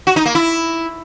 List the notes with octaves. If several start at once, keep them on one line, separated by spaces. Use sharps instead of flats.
F#4
D#4
A#3
E4